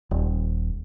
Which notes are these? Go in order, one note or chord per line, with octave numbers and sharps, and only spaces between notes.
D#1